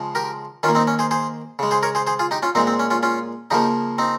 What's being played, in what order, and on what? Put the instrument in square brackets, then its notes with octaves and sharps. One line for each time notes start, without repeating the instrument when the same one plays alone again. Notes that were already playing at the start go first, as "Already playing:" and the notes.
Already playing: [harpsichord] C#3 F3 G#3
G4 A#4
D#3 C#4 F4
A#3
C4 D#4
C#4
G#4 C5
G#4 C5
C#3 G#3
G#4 C5
A#4 C#5
G#4 C5
G#4 C5
F4 G#4
D#4 G4
C#4 F4
A#2 G#3 C4 D#4
C4
C#4
C#4 F4
C#4 F4
C#3 F3 A#3 D#4 G4
C4 D#4